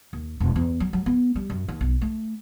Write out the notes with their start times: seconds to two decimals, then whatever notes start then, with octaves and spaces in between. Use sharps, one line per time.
0.13 D#2
0.40 E1
0.56 E2
0.80 F#3
0.93 F#3
1.06 B3
1.36 G3
1.50 F#2
1.68 D#2
1.81 B1
2.01 A3